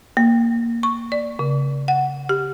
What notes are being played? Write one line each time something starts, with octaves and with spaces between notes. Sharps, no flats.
A#3
C#6
D5
C#3
F#5
G4